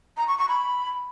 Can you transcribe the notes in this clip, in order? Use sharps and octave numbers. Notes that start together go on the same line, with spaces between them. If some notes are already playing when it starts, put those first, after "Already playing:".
A#5
C#6
C#6
B5